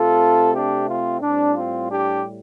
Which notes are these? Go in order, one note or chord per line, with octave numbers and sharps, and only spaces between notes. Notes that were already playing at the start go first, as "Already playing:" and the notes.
Already playing: C3 A3 C4 F4 A4
D4 G4
C4 F4
A2 G3 C4 D4
C4 F4
D4 G4